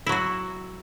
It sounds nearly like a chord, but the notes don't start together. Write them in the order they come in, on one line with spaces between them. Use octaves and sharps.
E4 F#3 F#4